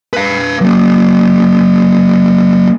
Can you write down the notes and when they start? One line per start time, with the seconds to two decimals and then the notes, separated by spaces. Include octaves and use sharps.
0.13 B4 F5
0.61 F#3 A#3